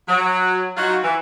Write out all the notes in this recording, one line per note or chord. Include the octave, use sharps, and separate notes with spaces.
F#3
F#3 D#4 F4 F#4
E3